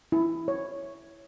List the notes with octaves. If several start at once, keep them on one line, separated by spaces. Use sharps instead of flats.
E4
C#5